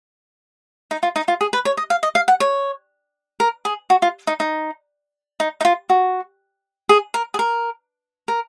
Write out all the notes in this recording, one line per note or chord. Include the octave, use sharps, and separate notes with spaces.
D#4
F4
D#4
F4
G#4
B4
C#5
D#5
F5
D#5
F5
F#5
C#5
A#4
G#4
F#4
F4
D#4
D#4
D#4
D#4
F4
F#4
G#4
A#4
G#4
A#4
A#4